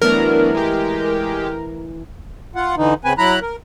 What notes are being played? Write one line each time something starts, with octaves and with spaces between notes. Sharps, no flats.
E3 F#3 A3 B3 D4 A#4
G#3 G4
F4 F#5
D3 E3 D#4
C#3 C4 B4 G#5
F#3 E4 A#5 B5 F#6
A#4